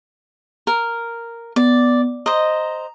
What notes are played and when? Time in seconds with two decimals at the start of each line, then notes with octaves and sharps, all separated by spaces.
0.67 A#4
1.56 B3 D5
2.26 C5 D#5 A#5